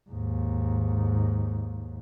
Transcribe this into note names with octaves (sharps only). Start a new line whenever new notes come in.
D#2 G#2